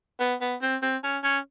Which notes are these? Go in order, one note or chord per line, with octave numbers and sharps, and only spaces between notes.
B3
B3
C4
C4
C#4
C#4